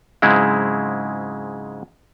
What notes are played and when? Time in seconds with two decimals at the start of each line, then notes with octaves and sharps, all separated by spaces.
0.22 G#2 C#3 F#3 G#3 C4 E4